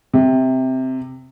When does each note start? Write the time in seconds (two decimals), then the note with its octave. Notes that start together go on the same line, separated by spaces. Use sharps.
0.14 C3